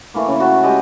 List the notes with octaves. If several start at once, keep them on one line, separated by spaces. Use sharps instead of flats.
E3 A3 A#3
C#3 E3
E4 F#4 E5 A5
G#3 G4 D#5